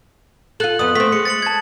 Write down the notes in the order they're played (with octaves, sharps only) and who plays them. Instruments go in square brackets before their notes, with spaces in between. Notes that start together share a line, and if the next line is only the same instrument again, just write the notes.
[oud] F4 A4 [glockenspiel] F#6 F#7
[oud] F2 B3 [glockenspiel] D#6
[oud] A3 C4 [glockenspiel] B6
[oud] G#3 [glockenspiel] C#7
[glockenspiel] A6 C#7 F#7
A5 G#6